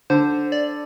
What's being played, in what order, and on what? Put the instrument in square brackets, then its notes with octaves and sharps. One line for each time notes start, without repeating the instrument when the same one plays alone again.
[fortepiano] D3 [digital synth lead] C5
[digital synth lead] D5